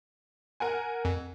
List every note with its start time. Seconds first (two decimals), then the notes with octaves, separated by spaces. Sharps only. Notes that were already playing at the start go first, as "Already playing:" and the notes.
0.60 A#4 F#5 G#5
1.05 F2